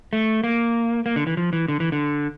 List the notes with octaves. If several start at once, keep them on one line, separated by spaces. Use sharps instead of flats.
A3
A#3
A#3
D3
E3
F3
E3
D3
E3
D3